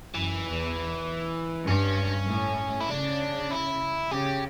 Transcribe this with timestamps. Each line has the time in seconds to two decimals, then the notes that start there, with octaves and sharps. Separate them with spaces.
0.14 F#2 E3
0.45 E2
1.66 G2 C#4
2.28 A2
2.81 E4
2.89 C#3 D4
3.51 E4
4.11 C#3 G4